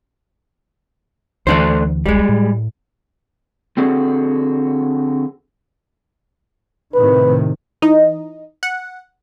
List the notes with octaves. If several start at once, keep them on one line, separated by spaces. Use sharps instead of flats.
D2 E3 A3 D4 C5
D1 A1 G3 G#3
A2
D3 C4 F#4 G#4 A4
A2 C3 D#3 B4
E3 D#4 D#5
F#5